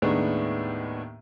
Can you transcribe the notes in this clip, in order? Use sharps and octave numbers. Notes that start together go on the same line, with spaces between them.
D#2 A2 D#3 G#3 B3 D4